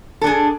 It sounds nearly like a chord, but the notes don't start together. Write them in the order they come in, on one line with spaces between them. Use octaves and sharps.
A4 D4 G#4